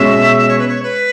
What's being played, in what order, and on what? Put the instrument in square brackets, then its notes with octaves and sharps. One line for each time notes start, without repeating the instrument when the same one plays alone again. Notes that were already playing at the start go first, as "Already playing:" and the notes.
Already playing: [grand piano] B2 G#3 C#4 [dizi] E5
[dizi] E5
C#5
B4
C#5
B4